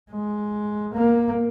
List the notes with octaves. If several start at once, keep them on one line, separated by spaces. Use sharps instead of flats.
G#3
A#3